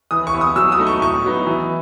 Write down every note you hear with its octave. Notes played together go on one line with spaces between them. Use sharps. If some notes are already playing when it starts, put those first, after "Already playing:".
E3 D#6
C#6
B3 E4
D#6
F#3 E6
D#6
A3 D#4
C#6
A2 C#6
F#3 B3 D#4
E3